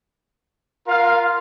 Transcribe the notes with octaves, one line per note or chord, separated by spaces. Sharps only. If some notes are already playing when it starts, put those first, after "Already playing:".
F4 A#4 F5